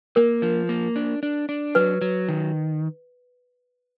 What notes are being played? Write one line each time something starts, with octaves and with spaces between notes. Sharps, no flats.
A#3 A#4
F3
A#3
D4
D4
D4
F#3 B4
F#3
D#3